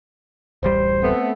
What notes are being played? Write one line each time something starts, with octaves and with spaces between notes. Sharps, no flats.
D1 A1 G3 C5
A3 B3 C4